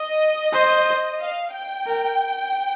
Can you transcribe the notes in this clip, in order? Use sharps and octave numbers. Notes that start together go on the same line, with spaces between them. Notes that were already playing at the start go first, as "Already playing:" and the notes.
Already playing: D#5
C5
F5
G5
A#4